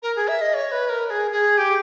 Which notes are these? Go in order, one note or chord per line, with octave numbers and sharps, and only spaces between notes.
A#4
G#4
E5
D#5
C#5
B4
A#4
A#4
G#4
G#4
G4